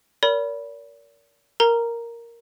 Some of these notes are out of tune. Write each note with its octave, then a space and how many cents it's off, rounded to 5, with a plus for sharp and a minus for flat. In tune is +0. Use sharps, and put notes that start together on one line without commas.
A#4 +0 D5 -45 B5 -15
A#4 +0 A#5 +0